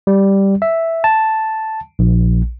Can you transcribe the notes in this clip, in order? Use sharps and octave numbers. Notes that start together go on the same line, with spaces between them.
G3
E5
A5
A#1